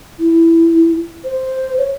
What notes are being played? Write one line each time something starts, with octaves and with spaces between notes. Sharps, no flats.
E4
C5
C#5